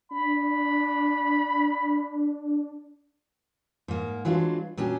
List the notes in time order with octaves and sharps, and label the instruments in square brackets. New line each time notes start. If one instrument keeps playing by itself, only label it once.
[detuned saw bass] D4 [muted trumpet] B5
[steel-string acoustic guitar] G#2 A#3
E3 F#3 G#3 D4 F4
A#2 F#3 C#4 D4 G4